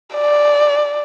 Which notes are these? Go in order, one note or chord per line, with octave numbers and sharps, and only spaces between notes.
D5